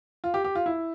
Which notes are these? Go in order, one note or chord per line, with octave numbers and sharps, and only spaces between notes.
F4
G4
G4
F4
E4